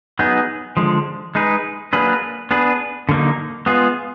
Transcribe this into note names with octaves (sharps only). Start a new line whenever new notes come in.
F#3 B3 D#4 G#4
D3 F3 G#3
G#3 D#4 G#4 B4
F#3 A#3 D4 G#4 B4
B3 D4 G#4 B4
D3 F#3 A#3 D#4
G#3 B3 F4 G#4